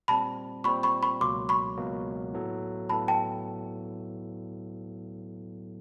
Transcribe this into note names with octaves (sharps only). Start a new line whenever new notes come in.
A#2 G3 C4 A5 B5
A#2 G3 C4 B5 C#6
B5 C#6
B5 C#6
C#2 B2 F#3 A#3 C6 D6
B5 C#6
C#2 B2 F#3 A#3
A2 F#3 B3 E4 A4
A2 F#3 B3 E4 A4 A5 B5
G5 A5